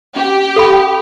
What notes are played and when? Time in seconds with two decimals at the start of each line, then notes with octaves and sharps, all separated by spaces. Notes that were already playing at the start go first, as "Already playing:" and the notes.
0.16 C#4 G4
0.56 A4 F5 B5